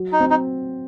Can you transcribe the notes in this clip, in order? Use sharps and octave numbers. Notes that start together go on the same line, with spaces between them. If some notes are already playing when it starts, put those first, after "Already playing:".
Already playing: F#3
D#4
C4
D#4